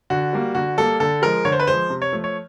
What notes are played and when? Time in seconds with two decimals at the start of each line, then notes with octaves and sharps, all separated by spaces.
0.10 D3 F#4
0.33 G3 A#3
0.55 D3 F#4
0.77 G3 A#3 A4
1.00 D3 A4
1.22 F3 G#3 A#4
1.45 D3 C#5
1.52 C5
1.60 B4
1.67 F3 G#3 C5
1.90 C3
2.02 C#5
2.13 F3 A3
2.24 C#5